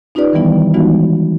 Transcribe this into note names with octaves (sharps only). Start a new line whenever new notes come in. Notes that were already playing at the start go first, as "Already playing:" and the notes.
C#4 D#4 F4 G4 B4 D5
D#3 E3 G3 B3 E4
E3 G#3 B3 D#4 F4 F#4